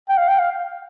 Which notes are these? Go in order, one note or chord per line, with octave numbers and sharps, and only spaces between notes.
G5
F5
G5
F5